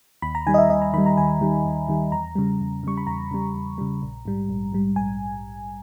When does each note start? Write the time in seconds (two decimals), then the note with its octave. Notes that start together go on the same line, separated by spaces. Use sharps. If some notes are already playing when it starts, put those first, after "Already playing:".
0.22 D#2 B5
0.35 A#5
0.47 D#3 G3 G#5
0.54 D#5
0.58 E5
0.70 D#2 D#5
0.82 A#5
0.94 D#3 G3 B5
1.06 A#5
1.17 D#2 G#5
1.41 D#3 G3
1.65 D#2
1.89 D#3 G3
2.12 E2 A#5
2.35 C#3 G3
2.60 E2
2.83 C#3 G3 C#6
2.97 B5
3.07 E2 A#5
3.31 C#3 G3
3.54 E2
3.78 C#3 G3
4.02 A#1
4.25 G#2 G3
4.49 A#1
4.73 G#2 G3
4.96 A#1 G#5